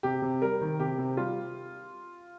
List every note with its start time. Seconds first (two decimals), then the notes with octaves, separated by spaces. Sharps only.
0.03 C3 G4
0.22 C3
0.42 G3 A#4
0.61 D#3
0.80 C3 G4
0.98 C3
1.17 G3 F4